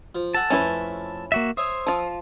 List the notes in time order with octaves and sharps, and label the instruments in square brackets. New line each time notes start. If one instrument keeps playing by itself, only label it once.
[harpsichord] F3
[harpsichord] A4 F#5 G#5 [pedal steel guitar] A5
[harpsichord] F2 A3 [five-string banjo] C#4 E4 B4
[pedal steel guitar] A#3 F#4 E5
[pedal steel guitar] C5 [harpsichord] C#5 E5 D#6
[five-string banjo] F3 F4